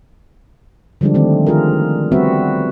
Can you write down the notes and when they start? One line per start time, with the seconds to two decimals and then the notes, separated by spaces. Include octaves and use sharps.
1.01 D3 F3 G3 G#3 D4
1.14 D#3 A3 C4
1.47 D#3 F4 G#4 A#4
2.12 G3 B3 C4 F#4 B4 E5